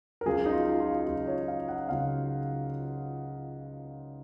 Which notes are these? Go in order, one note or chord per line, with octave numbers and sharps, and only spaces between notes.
A#4
C#2 C#3 F#3 G#4
D#4
F4
F4
C#2 C#3 F#3 F4
C#5
F5
F#5
C#2 C#3 F#3 F5